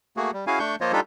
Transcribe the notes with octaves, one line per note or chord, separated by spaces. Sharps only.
A3 A#3 F#4 G#4
G3
C#4 E4 F#4 G#4 F5 G#5
A3 D4 C#6 G6
F3 A#3 F4 C5 C#5 D#5
G3 D4 D#4 F4 G4 A4